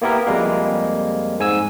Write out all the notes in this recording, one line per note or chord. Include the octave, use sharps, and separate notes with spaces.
A#3 B3 E4 G4 A#4
F2 G3 G#3 A#3
G#2 G#5 E6